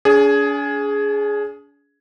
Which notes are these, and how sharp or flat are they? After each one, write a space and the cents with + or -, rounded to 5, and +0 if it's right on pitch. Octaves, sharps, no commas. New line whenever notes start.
D4 -45 G#4 +5